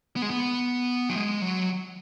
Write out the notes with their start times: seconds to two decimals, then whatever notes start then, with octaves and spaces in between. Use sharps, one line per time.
0.16 B3
0.22 G#3
0.30 B3
1.10 F#3
1.16 G#3
1.41 F#3